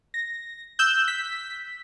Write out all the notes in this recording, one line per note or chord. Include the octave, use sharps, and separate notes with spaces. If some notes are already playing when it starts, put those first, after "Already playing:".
A#6
E6 F#6 G6
B6